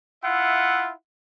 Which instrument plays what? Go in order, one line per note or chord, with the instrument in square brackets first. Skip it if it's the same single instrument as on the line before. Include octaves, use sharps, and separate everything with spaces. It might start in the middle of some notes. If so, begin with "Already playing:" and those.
[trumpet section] E4 F4 E5 F#5